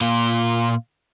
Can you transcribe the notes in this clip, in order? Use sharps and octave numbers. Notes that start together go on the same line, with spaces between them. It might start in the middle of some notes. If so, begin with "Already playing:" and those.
A#2 F4